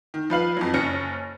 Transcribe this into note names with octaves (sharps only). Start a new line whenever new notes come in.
D#3
F3 B4 F5 F#7
F2 E3 F#3
F#1 C#4 A#6 C#7